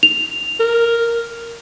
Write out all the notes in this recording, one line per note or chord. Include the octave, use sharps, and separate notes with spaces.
F7
A#4